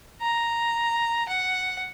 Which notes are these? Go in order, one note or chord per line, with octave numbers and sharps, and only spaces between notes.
A#5
F#5